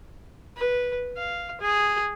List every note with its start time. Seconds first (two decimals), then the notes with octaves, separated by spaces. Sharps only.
0.56 B4
1.17 F5
1.61 G#4